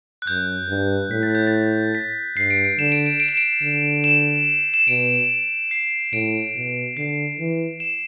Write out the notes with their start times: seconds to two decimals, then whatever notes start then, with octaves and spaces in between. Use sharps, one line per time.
0.22 F#6
0.27 F#2 G6
0.69 G2
1.11 A2 B6
1.23 A6
1.35 G6
1.47 A6
1.95 B6
2.36 G2 C7
2.50 D7
2.65 D7
2.78 D3 E7
2.92 D7
3.06 D7
3.20 D7
3.29 E7
3.37 D7
3.62 D3
4.04 E7
4.74 E7
4.88 B2 D7
5.71 C7
6.12 A2 D7
6.55 B2
6.97 D3 C7
7.39 E3
7.80 E7